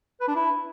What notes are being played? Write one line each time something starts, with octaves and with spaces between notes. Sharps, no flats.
B4
D4
E4